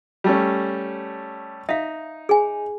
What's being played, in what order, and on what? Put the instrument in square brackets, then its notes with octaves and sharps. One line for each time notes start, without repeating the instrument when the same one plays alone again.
[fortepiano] G3 A3 C#4
[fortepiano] D#4 [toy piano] E5 F5
[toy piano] G#4 G#5